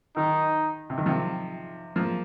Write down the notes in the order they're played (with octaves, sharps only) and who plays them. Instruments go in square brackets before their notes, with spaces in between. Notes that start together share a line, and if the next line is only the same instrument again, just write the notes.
[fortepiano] D#3 [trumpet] D#4
[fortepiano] C3
D#3
C3 F3
F3 A#3